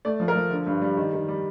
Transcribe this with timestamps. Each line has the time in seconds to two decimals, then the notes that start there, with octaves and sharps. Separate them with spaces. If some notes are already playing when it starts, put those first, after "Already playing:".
0.05 A3 D5
0.20 F3
0.28 A#4
0.36 F3
0.51 D3
0.67 G2
0.82 G3
0.97 D#3
1.13 D#3
1.28 G3